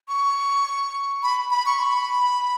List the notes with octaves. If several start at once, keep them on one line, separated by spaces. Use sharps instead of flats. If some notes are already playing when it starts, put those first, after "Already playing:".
C#6
B5
B5
C#6
B5